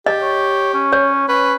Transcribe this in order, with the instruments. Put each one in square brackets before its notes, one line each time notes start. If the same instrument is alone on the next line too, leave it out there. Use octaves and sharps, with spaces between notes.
[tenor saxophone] G4 [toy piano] D#5
[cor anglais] C#5
C#4
[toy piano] C#5
[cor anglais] C#4 [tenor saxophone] B4